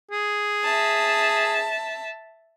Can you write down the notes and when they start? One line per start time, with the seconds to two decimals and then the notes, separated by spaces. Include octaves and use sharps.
0.11 G#4
0.64 E5 A5